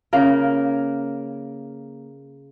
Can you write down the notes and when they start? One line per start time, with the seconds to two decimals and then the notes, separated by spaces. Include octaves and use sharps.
0.13 C#3 A#3 A#4